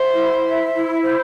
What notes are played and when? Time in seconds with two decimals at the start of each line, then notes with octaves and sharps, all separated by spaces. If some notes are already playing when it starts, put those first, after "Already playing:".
Already playing: C5 E5
0.13 E4
0.43 E5
0.73 E4
1.02 C5